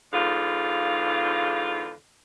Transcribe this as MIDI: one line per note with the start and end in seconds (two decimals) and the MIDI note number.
0.13 1.90 40
0.13 1.90 44
0.13 1.90 50
0.13 1.90 65
0.13 1.90 77